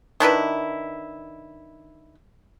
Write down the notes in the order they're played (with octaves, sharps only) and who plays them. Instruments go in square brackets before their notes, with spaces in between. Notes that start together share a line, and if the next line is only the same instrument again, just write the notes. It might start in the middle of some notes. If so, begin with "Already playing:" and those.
[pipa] D#3 D4 E4 B4